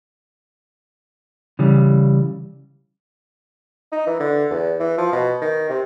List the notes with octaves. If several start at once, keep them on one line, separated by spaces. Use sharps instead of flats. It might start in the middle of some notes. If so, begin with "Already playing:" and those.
C#3 E3 G3
D#4
E3
D3
E2
E3
F3
B2
D#3
C3